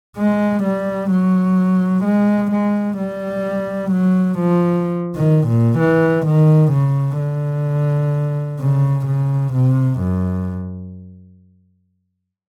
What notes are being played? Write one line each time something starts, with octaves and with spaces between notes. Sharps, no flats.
G#3
G3
F#3
G#3
G#3
G3
F#3
F3
D#3
A#2
E3
D#3
C#3
D3
C#3
C#3
C3
F#2